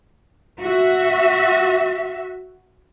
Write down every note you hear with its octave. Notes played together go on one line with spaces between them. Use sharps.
F#4 E5